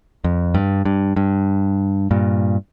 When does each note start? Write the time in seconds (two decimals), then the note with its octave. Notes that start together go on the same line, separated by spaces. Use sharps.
0.24 F2
0.54 G2
0.85 G2
1.16 G2
2.11 G2 A#2